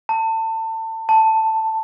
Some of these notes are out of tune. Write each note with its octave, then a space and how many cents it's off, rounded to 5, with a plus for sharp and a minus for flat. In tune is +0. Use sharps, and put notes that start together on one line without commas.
A5 +30
A5 +10